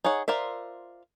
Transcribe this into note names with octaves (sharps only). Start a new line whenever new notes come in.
D#4 G#4 C#5 F#5
F4 A#4 C5 D5 E5